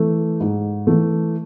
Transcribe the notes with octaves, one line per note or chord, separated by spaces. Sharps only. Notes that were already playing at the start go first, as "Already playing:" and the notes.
Already playing: E3 A3
G#2
E3 A3